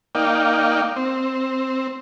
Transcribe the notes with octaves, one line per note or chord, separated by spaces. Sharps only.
A#3 D#4 D5 F5 G5
C4